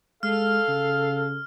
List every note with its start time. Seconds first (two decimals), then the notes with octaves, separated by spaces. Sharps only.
0.23 G#3 A4 F5 F6
0.68 C#3